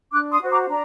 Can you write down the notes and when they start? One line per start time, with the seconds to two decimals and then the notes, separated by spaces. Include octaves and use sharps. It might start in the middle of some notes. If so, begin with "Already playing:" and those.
0.12 D4 D6 F#6
0.32 C6 D#6
0.42 F#4 C5
0.50 A#5 D6
0.69 D4 A#5